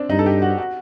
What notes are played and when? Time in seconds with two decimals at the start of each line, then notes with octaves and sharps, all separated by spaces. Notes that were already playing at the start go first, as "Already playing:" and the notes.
Already playing: C4 D4
0.09 G2 D#4
0.19 A4
0.26 G4
0.42 F#4
0.58 F#4